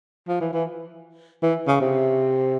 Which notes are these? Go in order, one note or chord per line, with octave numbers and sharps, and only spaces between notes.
F3
E3
E3
E3
C#3
C3